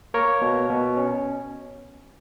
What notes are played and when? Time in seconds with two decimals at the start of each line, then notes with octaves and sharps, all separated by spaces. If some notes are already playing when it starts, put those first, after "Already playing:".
0.14 A#3 A#4 C#5
0.41 B2
0.70 B2
0.97 C#4